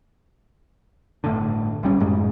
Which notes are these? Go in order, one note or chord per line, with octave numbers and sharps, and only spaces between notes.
G1 A2 D3
A#1 G3 C#4
F#2 A2 G#3